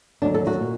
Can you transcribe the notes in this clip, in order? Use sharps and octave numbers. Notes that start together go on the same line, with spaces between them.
D#2 D3 F#3 D4
A4
F#4
A#2